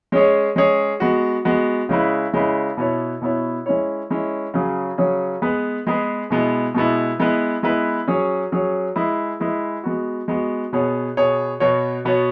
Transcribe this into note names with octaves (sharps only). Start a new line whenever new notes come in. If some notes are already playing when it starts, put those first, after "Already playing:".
G#3 C#4 G#4 C#5
G#3 C#4 G#4 C#5
G#3 B3 F#4
G#3 B3 F#4
C#3 G#3 E4 B4
C#3 G#3 E4 B4
B2 B3 E4 C#5
B2 B3 E4 C#5
G#3 C#4 E4 C#5
G#3 C#4 E4 C#5
C#3 F#3 C#4 G#4
C#3 F#3 C#4 G#4
G#3 B3 G#4 B4
G#3 B3 G#4 B4
B2 G#3 B3 E4
B2 G#3 B3 E4
G#3 B3 E4 B4
G#3 B3 E4 B4
F#3 C#4 G#4 C#5
F#3 C#4 G#4 C#5
G#3 E4 G#4 B4
G#3 E4 G#4 B4
G#3 B3 F#4
G#3 B3 F#4
B2 B3 G#4 C#5
B2 B3 G#4 C#5
B2 B3 F#4 C#5
B2 B3 F#4 C#5